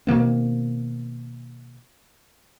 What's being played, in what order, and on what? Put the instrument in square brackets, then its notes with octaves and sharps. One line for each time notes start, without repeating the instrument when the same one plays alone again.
[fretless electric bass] B2 D#3 A#3 C4